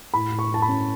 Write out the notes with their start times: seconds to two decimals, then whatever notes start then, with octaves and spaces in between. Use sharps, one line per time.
0.14 A2 B5
0.32 A2
0.39 C#6
0.51 A2 A5
0.62 B5
0.69 C#4